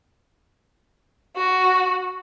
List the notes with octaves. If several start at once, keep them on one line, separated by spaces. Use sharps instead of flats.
F#4